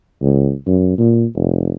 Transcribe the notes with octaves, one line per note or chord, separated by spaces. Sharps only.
C#2
F#2
A#2
F1